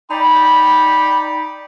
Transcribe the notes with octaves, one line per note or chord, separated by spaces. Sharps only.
D#4 D5 G5 B5